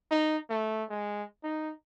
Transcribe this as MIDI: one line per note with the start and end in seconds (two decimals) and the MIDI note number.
0.11 0.37 63
0.50 0.84 57
0.89 1.24 56
1.44 1.73 63